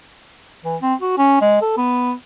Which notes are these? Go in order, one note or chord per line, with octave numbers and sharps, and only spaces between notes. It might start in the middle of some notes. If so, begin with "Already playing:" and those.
E3
C4
F#4
C#4
G#3
A4
B3